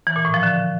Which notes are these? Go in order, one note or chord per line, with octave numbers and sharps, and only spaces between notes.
E3
A#2
A2
F3
D3